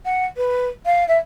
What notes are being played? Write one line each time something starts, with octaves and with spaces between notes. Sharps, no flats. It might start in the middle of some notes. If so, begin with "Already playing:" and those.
F#5
B4
F5
E5